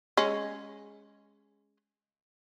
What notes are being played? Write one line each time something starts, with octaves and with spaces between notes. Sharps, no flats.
G#3 C#4